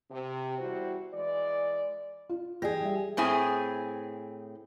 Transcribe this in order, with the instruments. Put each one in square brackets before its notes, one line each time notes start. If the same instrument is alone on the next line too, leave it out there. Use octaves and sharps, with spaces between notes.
[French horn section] C3
E2 G3 E4 F#4 C5
E3 G#3 D5
[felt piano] F4
[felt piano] E3 D5 A#6 [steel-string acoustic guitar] G4 G#4
[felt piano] G3 E5
[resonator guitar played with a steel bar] A2 C4 E4 G#4